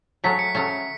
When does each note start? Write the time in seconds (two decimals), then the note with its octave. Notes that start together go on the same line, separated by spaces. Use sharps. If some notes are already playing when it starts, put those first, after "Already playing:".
0.24 C#3 F#3 A3 C#4 B6
0.39 C#7
0.55 C#3 F#3 A3 C#4